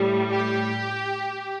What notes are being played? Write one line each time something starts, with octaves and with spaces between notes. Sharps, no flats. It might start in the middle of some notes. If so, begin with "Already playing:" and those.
Already playing: A2 G3
G4